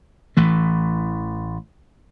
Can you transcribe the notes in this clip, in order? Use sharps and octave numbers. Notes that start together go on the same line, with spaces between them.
A1 E3 A3